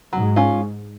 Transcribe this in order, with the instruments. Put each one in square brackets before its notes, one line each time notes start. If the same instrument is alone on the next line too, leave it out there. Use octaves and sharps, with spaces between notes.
[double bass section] G#2 [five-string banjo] F#3
[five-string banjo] C#4 F4